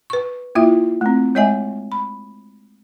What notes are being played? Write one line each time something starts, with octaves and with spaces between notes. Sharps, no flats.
B4 C#6
A#3 E4 F4 E5
A3 C4
G#3 C#5 D#5 E5 G#5
B5